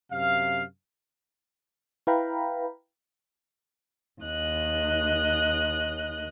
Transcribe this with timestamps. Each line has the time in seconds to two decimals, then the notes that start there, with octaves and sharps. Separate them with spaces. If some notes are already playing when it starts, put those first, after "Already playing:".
0.12 F#2 C3 F5
2.07 E4 B4 F5 G5 A#5 B5
4.23 D#2 D#5 F#6